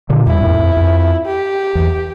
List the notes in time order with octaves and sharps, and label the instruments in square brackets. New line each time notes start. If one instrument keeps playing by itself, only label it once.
[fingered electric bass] A#2 D3
[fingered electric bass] E2 G2 [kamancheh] E4
[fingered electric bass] F2 A2
F2
F2
[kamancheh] G4
[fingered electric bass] E2